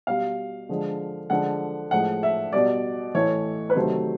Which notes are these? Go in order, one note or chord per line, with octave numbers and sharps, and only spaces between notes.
B2 G3 F5
D3 F3 G#3
D3 F3 G#3 F#5
A2 F3 G#3 F#5
E5
B2 G3 D5
A2 E3 A3 C#5
B4
C3 D#3 F#3 A3 C5